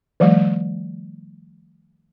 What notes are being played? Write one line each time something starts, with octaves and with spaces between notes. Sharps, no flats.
D#3 F3 G3 A3